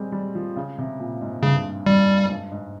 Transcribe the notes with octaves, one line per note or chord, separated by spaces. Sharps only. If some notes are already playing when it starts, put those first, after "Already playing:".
Already playing: G3 G#3 C4
G3
F3
C#3
C3
A#2
G#2
G2 C#3
F2 G3
G2
G#2